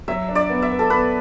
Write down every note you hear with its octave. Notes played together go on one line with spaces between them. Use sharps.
F#3 E5
D4
D5
B3
E5
B3
A4
B3 B4